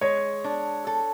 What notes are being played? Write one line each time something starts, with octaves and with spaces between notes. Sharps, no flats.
G#3 C#5
D4
A4